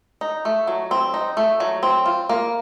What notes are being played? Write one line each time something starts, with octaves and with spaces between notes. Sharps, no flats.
D#4
A3
F#3
C4
D#4
A3
F#3
C4
F4
A#3